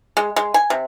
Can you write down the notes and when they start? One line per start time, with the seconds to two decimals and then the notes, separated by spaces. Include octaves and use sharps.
0.17 G#3
0.36 G#3
0.54 G#5
0.70 C3